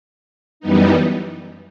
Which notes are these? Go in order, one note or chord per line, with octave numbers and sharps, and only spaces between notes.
F#2 E3 G3 B3 D#4